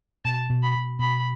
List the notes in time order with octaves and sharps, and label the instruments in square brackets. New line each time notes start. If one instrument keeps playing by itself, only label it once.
[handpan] B2 [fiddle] A5
[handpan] B2
[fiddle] B5
[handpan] B2
[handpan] B2 [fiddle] B5